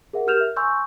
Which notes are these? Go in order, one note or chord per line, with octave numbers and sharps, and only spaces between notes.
G#4 A#4 E5 F#5
G4 A#4 F6 G6 E7 F7
E5
G#5 C6 C#6 E6 G6